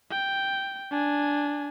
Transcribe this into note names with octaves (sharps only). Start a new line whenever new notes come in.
G5
D4 G#5